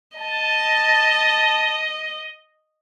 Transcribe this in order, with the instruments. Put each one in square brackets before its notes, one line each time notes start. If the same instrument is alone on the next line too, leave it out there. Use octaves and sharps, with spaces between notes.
[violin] D#5 [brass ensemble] A5